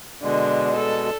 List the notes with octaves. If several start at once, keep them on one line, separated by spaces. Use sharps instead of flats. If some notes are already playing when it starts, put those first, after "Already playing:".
B2 D3 G#3
A4